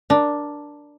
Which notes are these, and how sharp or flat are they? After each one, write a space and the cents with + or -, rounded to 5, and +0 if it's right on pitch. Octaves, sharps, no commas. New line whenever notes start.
D4 +0 A#4 +15